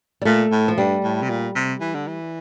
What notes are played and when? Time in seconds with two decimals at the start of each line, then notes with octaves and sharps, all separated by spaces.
0.22 G3
0.25 A#2 A3
0.52 A2
0.68 F3
0.78 G2 G3
1.04 A2
1.23 C3
1.30 A#2
1.55 C3
1.81 E3
1.95 D3
2.08 E3